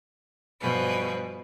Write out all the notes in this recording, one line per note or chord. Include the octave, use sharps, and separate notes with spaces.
G2 B2 F3 G#4 B4